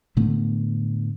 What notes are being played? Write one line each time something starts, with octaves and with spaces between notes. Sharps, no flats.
A2 D3 A3 B3